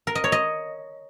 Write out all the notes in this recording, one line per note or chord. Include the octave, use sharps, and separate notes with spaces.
A#4
D#5
C#5
D#5